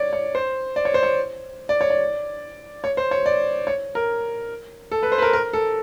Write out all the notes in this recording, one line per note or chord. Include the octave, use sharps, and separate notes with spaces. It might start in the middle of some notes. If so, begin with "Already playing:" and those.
Already playing: C#5 D5
C#5
C5
D5
C#5
C5
C#5
D5
C#5
D5
C#5
C5
C#5
D5
C#5
A#4
A4
B4
C5
B4
A#4
A#4
A4